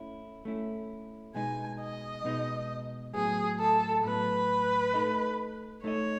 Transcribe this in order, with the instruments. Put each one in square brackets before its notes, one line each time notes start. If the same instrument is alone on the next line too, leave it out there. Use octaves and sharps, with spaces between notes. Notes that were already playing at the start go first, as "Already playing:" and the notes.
Already playing: [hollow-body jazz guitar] A3 C#4 E4
A3 C#4 E4
[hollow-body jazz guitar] B2 G#3 B3 D#4 [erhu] G#5
[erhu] D#5
[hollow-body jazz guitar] B2 G#3 B3 D#4
[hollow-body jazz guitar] A2 F#3 B3 [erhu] G#4
[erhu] A4
[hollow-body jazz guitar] A2 F#3 B3 [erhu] B4
[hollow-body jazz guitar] A3 D#4 A4 D#5
[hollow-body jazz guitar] A3 D#4 A4 D#5 [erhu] C#5